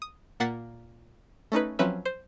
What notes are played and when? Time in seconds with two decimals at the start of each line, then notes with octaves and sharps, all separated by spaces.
0.02 D#6
0.40 A#2 A#3 F#5 A6 B6 C7
1.52 A3 C#4 D#4 B4
1.79 F3 F#3 C4 C#4 B4 E5
2.05 C5